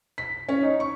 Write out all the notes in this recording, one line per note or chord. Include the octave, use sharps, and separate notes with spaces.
B6
C#4
D#4
C#6